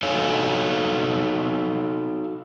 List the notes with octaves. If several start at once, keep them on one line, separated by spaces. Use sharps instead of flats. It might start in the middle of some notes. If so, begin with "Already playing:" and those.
D#4 F#4 A4 C#5 F5 G#5